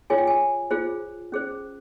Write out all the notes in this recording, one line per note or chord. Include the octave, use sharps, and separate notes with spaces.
F4 G#4 C#5 G#5
G5
G#5
F4 G#4 C5
C#4 G#4 C5